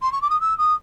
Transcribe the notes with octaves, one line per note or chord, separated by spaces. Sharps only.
C6
C#6
D6
D#6
E6
D#6